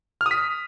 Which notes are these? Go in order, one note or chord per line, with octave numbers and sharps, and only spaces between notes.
F6
D#6
B6